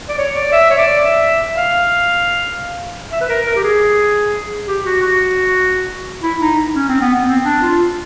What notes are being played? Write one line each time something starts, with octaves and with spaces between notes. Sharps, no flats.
D5
C#5
D5
E5
C#5
D5
E5
F5
E5
B4
A#4
A#4
G4
G#4
G4
F#4
F#4
E4
D#4
C#4
C4
B3
B3
C4
D4
F4